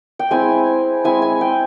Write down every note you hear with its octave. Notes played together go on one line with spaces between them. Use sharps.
G5
G#3 C4 E4 G#5
G#3 C4 E4 G#5
G#5
G5